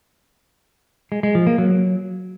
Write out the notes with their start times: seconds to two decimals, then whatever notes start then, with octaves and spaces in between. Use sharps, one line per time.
1.12 G#3
1.23 G#3
1.35 F3
1.47 A#3
1.58 F#3